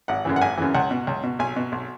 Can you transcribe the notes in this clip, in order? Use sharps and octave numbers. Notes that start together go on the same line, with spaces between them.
G#1 F#5
F#2 C#3 E3
F#5
G#1 G#5
F#2 C#3 E3
C#2 F#5
B2
C#2
B2
B1 G#5
B2
B1